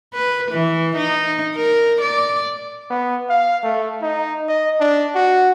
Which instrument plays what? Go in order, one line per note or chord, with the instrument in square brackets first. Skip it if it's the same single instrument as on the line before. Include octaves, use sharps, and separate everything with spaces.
[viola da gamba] B4
E3
D#4
A#4
D5
[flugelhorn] B3
F5
A3
D#4
D#5
D4
F#4